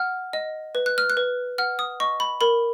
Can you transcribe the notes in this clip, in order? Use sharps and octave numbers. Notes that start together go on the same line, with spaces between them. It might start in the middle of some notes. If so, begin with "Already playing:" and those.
Already playing: F#5 F6
D#5
B4
F#6
F6
F#6
B4
F#5 F6
D#6
D#5 C#6
B5
A#4 B5